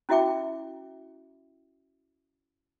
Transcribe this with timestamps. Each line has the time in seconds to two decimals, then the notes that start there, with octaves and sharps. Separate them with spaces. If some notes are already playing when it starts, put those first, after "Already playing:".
0.09 C#4 E4 F#4 E5 G5 D6